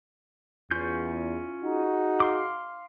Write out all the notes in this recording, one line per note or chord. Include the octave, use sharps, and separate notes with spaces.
E2 C#4 F4 G6
D#4 F#4 G#4
F5 C6 D6